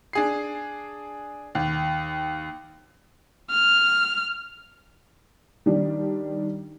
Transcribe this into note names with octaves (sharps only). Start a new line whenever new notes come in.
D4 G#4 C7
D#2
F6
D#3 G3 D4